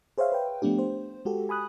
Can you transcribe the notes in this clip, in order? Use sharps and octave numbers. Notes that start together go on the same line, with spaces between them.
G#4 C5 C#5 E5 F5
B4 G5
F3 A3 B3 D4 G4
C5
G#3 F#4 G4 A4
G#5 B5 D#6 F#6